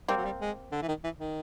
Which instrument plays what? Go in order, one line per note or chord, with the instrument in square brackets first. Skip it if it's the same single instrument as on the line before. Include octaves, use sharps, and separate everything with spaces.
[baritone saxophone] G3 [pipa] A#3 C4
[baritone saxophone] F#3
G3
G#3
D3
E3
D#3
E3
D#3